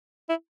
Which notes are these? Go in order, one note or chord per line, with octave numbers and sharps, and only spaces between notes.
E4